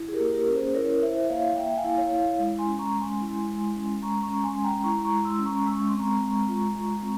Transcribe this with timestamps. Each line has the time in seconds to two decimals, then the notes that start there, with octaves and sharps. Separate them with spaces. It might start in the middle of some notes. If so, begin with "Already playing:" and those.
Already playing: E4
0.08 G#4
0.13 G4 A#4
0.20 A#3
0.34 G4 A#4
0.47 C#4
0.55 G#4 C5
0.74 E4 A#4 C#5
1.02 E4 C5 E5
1.24 E5
1.29 A#3 C#5 F5
1.56 A#3 E5 G5
1.70 G5
1.77 F5 G#5
1.84 E4
1.97 C#5 F5
2.11 E4
2.18 C#5 F5
2.39 G#3
2.59 G#5 C6
2.66 C#4
2.79 A#5 C#6
2.94 G#3
3.00 G#5 C6
3.21 E4
3.48 G#3
3.75 C#4
4.02 G#3 A#5 C#6
4.22 A#5 C#6
4.30 C#4
4.44 G#5 C6
4.57 G#3
4.64 G5 A#5
4.84 E4 A#5 C#6
5.05 A#5 C#6
5.12 G#3
5.25 C6 E6
5.39 C#4
5.45 A#5 C#6
5.66 G#3 E6
5.77 C#6
5.89 C4 C6
6.00 A#5 C#6
6.20 G#3
6.48 F4
6.75 G#3
7.02 C4